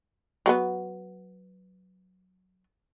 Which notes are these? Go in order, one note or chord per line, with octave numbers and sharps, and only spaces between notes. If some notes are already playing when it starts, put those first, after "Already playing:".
F#3 A#3 B3